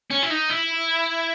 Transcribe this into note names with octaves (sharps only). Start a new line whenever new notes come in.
C#4
E4
D#4
E4